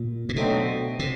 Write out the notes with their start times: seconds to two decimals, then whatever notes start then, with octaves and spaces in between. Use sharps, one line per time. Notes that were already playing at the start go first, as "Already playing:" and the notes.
Already playing: A#2
0.29 A#2
0.36 B2 D3 F#3 A3 C4 D#4
0.99 C3